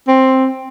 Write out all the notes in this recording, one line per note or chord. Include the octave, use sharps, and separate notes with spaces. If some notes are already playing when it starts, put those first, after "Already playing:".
C4